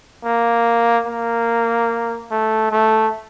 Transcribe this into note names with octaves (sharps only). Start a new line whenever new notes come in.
A#3
A#3
A3
A3